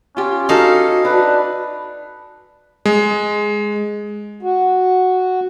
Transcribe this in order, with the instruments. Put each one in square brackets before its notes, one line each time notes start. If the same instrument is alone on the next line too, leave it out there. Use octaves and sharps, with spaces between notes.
[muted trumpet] C#4 [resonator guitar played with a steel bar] F4 G4
[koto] D#4 A4 F5 [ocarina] F#4
[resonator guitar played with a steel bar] D4 [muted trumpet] B4
[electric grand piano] G#3
[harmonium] F#4